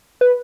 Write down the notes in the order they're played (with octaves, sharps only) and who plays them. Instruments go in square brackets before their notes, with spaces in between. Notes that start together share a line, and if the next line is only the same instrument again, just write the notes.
[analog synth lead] B4